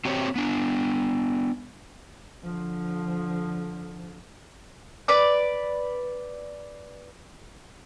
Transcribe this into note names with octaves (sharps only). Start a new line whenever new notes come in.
C4 F#4 G4 C5 C#5
B3 D4
D3 F3
B4 D5 D6